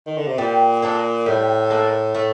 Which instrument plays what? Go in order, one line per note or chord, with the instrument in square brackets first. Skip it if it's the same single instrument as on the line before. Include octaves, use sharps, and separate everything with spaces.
[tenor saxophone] D#3
D3
C3
[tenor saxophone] A#2 [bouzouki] G3
[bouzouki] A#3 D4 A4
[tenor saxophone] A2 [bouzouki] G3
[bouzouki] A#3 D4 A4
[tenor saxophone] A2 [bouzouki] A3